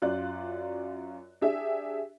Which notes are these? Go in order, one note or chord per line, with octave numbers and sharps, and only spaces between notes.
F#2 F4 D5 F#6
D4 G4 G#4 E5